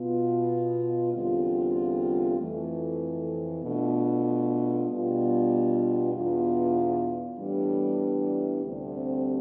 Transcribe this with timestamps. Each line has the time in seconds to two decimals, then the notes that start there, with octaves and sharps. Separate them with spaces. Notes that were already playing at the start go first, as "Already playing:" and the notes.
Already playing: B2 B3 F4
1.14 E2 D3 G3 C4 F4
2.38 F2 E3 A3
3.63 B2 A3 D4 F4
4.88 B2 G3 B3 D4 F4
6.13 E2 B2 B3 D4 F4
7.38 A2 E3 G3 B3 D4
8.63 D2 C3 G3 C4